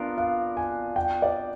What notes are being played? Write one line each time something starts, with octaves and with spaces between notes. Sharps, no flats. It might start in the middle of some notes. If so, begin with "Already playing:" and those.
Already playing: B3 D4 F4 A#4 F5
F5
G#5
G5
D5